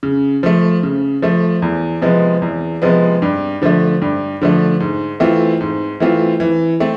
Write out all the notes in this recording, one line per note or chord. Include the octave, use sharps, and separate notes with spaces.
C#3
F3 A3
C#3
F3 A3
E2
C3 F3 G#3 B3
E2
C3 F3 G#3 B3
G2
D3 F3 A3
G2
D3 F3 A3
G#2
E3 A3 C4 F4
G#2
E3 A3 C4 F4
E3
A3 C4